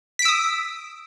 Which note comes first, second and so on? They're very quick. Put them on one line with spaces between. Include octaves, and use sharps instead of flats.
B6 D7 E6 D#6